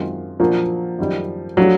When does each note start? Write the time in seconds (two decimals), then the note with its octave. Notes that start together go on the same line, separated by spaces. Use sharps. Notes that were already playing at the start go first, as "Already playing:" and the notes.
Already playing: F#2 D#3 G#3 C4 F4
0.40 A#2 F3 F#3 A#3 D4 F#4
0.99 F#2 D#3 G3
1.57 F3 F#3 A3 D4 G4